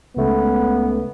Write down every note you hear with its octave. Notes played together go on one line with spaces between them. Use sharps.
C#2 A3 B3 C#4